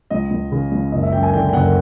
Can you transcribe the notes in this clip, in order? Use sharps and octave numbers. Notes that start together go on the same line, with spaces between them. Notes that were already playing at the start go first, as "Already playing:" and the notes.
C#2 D#5
C#2
C#3
C#2
F#1 D#5
E5
F#2 G5
G#5
D3 G5
G5
F#1 F#5